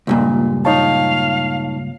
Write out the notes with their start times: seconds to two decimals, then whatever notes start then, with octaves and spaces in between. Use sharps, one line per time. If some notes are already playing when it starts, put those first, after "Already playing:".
0.07 C#2 G2 A#2
0.65 D#4 C#5 F5 A5